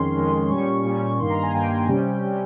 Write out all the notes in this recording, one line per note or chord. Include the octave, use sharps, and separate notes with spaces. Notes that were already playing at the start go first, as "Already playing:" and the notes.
Already playing: F2 D#3 G#3 C#4 C6
F2 D#3 G#3 C#4
A#2 G3 C#4 C#6
A#2 G3 C#4
G2 D#3 A#3 C6
A#5
G#5
G2 D#3 A#3 G5
C3 G3 C#4
C3 G3 C#4